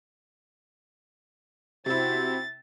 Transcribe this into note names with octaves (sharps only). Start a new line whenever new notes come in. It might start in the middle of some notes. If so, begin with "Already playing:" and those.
C3 C4 E4 F#4 C5 A6